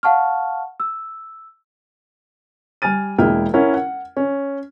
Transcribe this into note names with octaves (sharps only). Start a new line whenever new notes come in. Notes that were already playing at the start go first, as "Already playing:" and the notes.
F5 F#5 A5 C#6 F6
E6
G3 G#5 F6 A6 D#7
E1 G#3 A#3 E4 G5 F6
C#4 E4 A#4 F#5
F#5
C#4